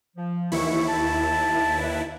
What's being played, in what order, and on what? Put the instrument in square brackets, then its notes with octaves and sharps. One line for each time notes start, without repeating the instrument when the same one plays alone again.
[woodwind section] F3
[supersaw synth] D#2 E4 [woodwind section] G#2 E3 C#6
[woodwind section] A5
D4 B4